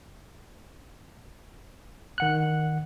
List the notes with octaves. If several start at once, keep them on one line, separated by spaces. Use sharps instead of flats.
D#3 F#5 F#6